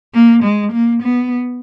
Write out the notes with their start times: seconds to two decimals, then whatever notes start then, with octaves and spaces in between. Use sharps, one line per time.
0.15 A#3
0.43 G#3
0.72 A#3
1.02 B3